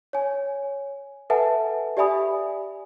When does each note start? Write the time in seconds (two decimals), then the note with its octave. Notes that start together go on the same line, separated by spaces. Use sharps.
0.13 C#5 G#5
1.30 A4 B4 E5 F#5 G#5 A5
1.97 G4 D5 E5 G#5 B5 D#6